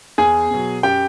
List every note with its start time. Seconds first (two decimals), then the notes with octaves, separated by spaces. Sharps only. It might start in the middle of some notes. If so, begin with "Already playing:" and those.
0.18 E2 G#4 G#5
0.51 B2 F#3
0.83 F#2 G4 G5